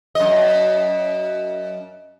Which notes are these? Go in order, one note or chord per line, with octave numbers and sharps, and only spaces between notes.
F#2 D#5